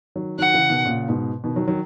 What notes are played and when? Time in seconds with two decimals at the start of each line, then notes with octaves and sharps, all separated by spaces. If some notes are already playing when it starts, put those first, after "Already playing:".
0.16 D#3 F#3
0.38 D#3 F#3 F#5
0.54 C#3 E3
0.70 B2 D#3
0.85 A#2 C#3
1.09 G#2 B2
1.44 B2 D#3
1.56 D#3 F#3
1.67 D#3 F#3